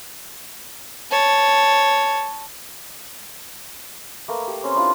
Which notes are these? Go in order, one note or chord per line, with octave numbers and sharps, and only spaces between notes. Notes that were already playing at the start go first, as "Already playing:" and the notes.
C#5 A5
A3 A#3 B4 A#5
G4
C4 C#4 C5
D4 E4 F4